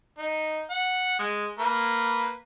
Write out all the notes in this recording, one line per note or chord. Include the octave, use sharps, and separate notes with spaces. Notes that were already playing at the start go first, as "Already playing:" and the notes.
D#4
F#5
G#3
A#3 B4